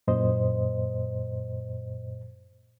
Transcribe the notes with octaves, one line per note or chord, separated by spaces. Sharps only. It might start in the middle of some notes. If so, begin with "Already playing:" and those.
F#2 A#2 C5 D#5